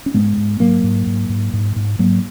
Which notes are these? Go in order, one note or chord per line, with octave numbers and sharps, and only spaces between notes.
C#4
G#2 G#3 B3
G#2
G#2 F#3 A#3
G#2
G#2
G#2
G#2
G#2
G#2 F#3 A#3